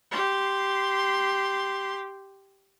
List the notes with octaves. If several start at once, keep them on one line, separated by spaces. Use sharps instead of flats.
G4 C6